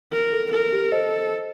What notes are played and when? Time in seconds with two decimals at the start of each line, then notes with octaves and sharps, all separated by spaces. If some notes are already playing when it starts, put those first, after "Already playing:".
0.13 A#4
0.33 A4
0.52 A4 A#4
0.73 G4
0.92 A4 C5 D#5